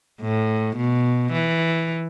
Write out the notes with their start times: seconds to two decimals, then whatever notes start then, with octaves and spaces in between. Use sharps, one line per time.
0.21 A2
0.77 B2
1.33 E3